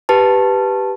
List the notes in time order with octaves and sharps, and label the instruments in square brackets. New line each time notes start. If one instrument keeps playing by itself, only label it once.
[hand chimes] G4 B4 A5